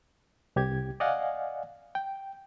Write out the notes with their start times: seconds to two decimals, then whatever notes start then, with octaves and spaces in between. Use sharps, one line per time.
0.56 C2 G4 G#6
1.00 D5 D#5 F5 F#5 G#5
1.95 G5